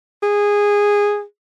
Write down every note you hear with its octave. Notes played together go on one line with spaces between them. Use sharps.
G#4